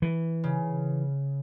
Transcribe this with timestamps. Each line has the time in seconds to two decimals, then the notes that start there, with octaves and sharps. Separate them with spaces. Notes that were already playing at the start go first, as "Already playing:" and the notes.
0.02 E3
0.44 C#3